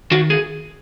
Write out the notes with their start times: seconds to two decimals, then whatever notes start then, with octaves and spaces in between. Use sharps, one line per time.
0.11 D#3 F#4
0.30 G#4